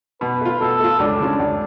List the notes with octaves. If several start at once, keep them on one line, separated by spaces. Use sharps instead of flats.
B2 B4
A3 F4
B2 A4
A3 F4
C#2 D4
C#3 G#3 C#4 F4
C#2